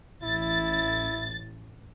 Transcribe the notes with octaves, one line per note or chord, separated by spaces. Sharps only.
A1 E4 A6